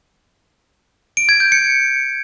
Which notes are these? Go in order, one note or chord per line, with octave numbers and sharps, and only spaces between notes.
D7
G#6
G6
C#7